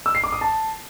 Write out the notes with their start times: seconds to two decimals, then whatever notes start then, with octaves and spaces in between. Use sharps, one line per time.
0.06 E6
0.15 C7
0.24 D6
0.32 D#6
0.41 A5